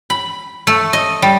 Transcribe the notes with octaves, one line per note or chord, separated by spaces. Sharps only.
B5
A3
D#5
G3